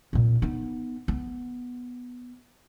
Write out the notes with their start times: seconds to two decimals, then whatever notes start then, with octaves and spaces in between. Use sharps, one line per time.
0.13 A#2 C4
0.42 B3 D#4
1.08 B3